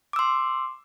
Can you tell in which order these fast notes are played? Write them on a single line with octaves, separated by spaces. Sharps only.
D6 E6 C6